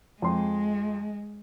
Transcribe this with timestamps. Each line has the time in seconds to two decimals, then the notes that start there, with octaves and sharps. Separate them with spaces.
0.22 F2 G#3 C6